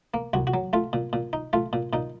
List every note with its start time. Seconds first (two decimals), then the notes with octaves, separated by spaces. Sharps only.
0.14 A#3
0.33 C2 F#4
0.47 F#4
0.54 F#3
0.73 A3 F4
0.93 A#2
1.13 A#2
1.33 D#4
1.53 A3 F4
1.73 A#2
1.93 A#2 D#4